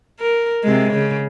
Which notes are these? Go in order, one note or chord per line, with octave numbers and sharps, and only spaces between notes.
A#4
C3 G#3
C#3